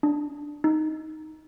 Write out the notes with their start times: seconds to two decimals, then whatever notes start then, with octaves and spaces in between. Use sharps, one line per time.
0.03 D4
0.64 D#4